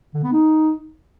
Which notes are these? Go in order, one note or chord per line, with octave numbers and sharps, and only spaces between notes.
D3
B3
D#4